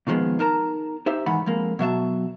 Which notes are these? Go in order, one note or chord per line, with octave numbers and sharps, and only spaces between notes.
A#2 D#3 F3 G#3 B3
D#4 A#4 A5 A#5
D#4 G4 C5 E5
G#2 D#3 E3 F#5 B5
F2 G#3 A#3
B2 F#3 E5 A5